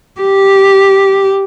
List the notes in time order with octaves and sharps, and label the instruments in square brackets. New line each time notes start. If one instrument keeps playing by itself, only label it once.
[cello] G4